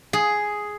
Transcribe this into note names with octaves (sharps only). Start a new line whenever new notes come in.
G#4